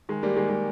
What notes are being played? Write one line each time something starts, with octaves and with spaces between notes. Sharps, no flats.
D#3 G#3
G3 A#3
D#3 G#3
G#3